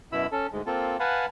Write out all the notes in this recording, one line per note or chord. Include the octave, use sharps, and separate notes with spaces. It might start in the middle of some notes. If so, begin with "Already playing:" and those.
F#2 B2 E4 B5 E6
C#4 A4
D2 G#2 G#3
A#3 C4 F4 A4
B4 F5 F#5 G#5 A5 B5